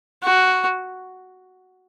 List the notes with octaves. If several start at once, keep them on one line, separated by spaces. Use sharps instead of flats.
F#4